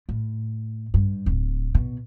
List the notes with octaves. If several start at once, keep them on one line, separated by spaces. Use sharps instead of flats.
A2
G2
D1
B2